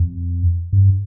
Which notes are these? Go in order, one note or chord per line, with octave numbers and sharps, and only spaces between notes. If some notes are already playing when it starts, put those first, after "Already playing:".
Already playing: F2
G2